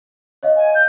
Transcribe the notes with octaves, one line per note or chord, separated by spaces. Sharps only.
C#5 D#5 F5
G#5
G6